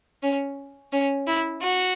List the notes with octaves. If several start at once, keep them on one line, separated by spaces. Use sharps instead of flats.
C#4
C#4
E4
F#4